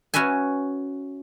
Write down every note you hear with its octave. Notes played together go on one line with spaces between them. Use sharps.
C#4 F#4 B4 E5 G#5